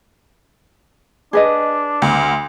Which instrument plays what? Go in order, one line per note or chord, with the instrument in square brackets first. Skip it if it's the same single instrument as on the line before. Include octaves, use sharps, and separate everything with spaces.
[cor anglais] D4 [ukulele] G#4 B4 D#5
[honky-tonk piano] D2